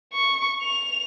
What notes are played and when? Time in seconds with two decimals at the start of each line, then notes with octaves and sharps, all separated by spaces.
0.13 C#6
0.63 F7